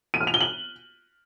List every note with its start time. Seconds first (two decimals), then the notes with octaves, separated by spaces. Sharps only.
0.14 D#7
0.21 F6
0.27 F7
0.34 G7
0.41 F#7